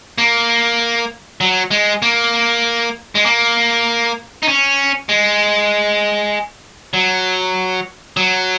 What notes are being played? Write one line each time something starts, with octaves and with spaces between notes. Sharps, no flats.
A#3
F#3
G#3
A#3
G#3
A#3
D#4
C#4
G#3
F#3
F#3